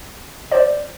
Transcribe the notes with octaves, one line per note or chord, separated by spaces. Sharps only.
C5 D5